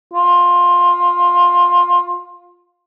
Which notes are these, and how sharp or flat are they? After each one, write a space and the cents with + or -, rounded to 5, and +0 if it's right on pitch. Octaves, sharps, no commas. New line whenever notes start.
F4 +15